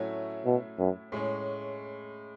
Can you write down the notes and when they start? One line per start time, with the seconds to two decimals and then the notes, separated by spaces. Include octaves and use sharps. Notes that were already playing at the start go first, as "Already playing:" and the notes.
Already playing: A2 F#3 A3 C#4 E4
0.45 B2
0.79 F#2
1.12 A2 G#3 C#4